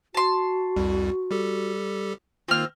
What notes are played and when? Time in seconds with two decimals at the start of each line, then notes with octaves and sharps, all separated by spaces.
0.14 F#4 A5 C6
0.77 C2 F2 G3
1.31 G3 G4 A4
2.48 D#3 A#3 C4 F4 F6